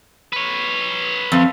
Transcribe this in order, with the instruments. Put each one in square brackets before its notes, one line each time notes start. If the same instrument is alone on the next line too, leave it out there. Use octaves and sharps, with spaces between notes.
[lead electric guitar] B4 C#5
[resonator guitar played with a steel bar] F2